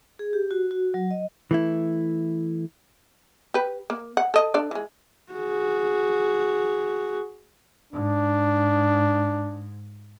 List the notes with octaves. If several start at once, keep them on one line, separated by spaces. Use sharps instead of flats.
G#4
G4
F#4
F#4
F#3
D#5
E3 A3 E4
G4 B4
A#3
F#5
A4 D#5
D4 A4 D5
E3 G#3
F#4 G#4
G#2 D4